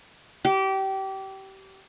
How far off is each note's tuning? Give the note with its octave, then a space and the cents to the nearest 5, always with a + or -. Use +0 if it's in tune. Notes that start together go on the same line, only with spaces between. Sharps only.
G4 -25